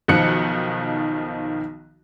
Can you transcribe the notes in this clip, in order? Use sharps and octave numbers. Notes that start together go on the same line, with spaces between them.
B1 D#3 F3 D#4 F#6 C#7